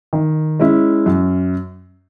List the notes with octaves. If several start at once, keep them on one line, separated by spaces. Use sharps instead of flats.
D#3
G#3 C#4 E4
F#2